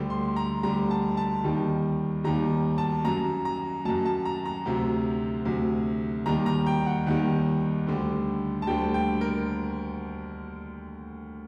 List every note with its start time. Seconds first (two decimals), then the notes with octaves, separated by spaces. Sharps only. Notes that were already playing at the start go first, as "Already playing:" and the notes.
Already playing: D2 D3 G3
0.10 C6
0.36 A#5
0.63 D2 D3 G3 A#5
0.91 A5
1.17 A5
1.44 D#2 D#3 G3
2.24 D#2 D#3 G3 A#5
2.78 A5
3.05 F#2 F#3 A#5
3.45 A#5
3.85 F#3 A5
3.89 F#2
4.05 A5
4.25 A#5
4.46 A#5
4.66 D2 C3 F#3
5.45 D2 C3 F#3
6.26 D#2 D#3 G3 A#5
6.46 A#5
6.67 G5
6.86 F#5
7.07 D#2 D#3 G3 F#5
7.87 D2 D3 G3
8.62 A5
8.67 D2 D3 G3 G5
8.94 G5
9.21 A#4